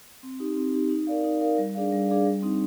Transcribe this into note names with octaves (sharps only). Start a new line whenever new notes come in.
C4
D#4 G4
C4
D#4 G4
D#4
A#4 D5 F5
D#4
A#4 D5 F5
G3
D4 G#4 D5 F5
G3
D4 G#4 D5 F5
G3
C4 D#4